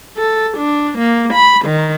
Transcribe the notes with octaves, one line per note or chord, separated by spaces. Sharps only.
A4
D4
A#3
B5
D#3